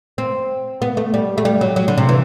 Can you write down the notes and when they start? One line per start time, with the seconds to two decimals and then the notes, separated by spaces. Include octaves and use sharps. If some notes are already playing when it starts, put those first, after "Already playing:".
0.18 C4
0.82 B3
0.97 A3
1.14 G3
1.38 A3
1.45 G3
1.61 F#3
1.76 F#3
1.88 D3
1.98 C3
2.09 E3